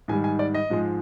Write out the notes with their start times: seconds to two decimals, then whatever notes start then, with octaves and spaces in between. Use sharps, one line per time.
0.08 G#2 D#3 G3 G#5
0.24 G#5
0.39 D5
0.54 D#5
0.70 G#2 F3 G#3